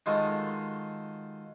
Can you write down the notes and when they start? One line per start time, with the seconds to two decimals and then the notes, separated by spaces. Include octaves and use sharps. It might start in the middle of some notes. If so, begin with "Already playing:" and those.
0.06 D#3 G#3 D#4 F4 F#4 A4